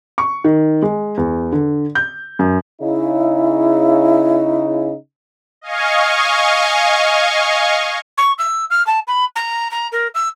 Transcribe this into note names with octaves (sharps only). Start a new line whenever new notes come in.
C#6
D#3
G#3
E2
D3
G6
F#2
C#3 D#4 E4
D#5 F5 G#5 C#6
C#6
E6
F6
A5
B5
A#5
A#5
A#4
E6